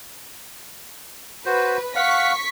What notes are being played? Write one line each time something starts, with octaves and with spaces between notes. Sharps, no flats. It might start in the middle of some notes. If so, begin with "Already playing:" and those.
F#4 B4 C5
F5 F#5 C#6 B6